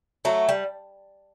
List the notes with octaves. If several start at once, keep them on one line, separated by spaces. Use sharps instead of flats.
F#3 A3
G3